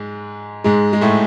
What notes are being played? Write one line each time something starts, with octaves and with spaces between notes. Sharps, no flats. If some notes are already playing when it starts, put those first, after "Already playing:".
Already playing: G#2 G#3
G#2 G#3
G#3
A2 A3